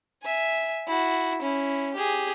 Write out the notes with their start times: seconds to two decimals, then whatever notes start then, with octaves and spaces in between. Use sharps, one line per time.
0.23 E5 G#5
0.88 E4 F#4
1.42 C#4 E4
1.94 G4 G#4